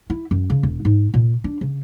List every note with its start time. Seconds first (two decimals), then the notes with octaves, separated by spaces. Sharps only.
0.10 E4
0.31 F#2
0.50 C#3
0.63 E1
0.85 G#2
1.14 A#2
1.44 D4
1.61 C#3